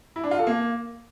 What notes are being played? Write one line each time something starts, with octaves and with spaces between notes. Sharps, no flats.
E4
D4
F4
A4
A#3